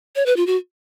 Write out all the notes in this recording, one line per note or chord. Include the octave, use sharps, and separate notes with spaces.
C#5
B4
F4
F#4